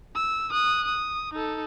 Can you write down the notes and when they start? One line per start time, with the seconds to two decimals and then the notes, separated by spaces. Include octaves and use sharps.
0.16 E6
0.51 D#6 F#6
0.86 D#6
1.34 D#4 A4